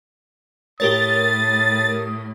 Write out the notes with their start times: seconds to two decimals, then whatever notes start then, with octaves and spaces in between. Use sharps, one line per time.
0.80 A2 G4 A#4 C#5 D#6 A6